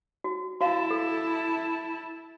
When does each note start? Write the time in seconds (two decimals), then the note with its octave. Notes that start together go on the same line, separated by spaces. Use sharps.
0.24 F#4
0.61 E4 F#4 F5 A5
0.91 A4